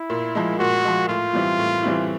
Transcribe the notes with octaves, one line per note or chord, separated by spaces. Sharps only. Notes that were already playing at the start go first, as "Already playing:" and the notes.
Already playing: E4
A#2
F3 G#3
A#2 F#4
F3 G#3
A2 F4
E3 G3 C4 E4
A2
E3 G3 C4 E4